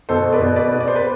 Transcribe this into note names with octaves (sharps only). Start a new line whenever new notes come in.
B2 A4 C5
B4 D5
B2
B4 D5
B3
D5
C5
B4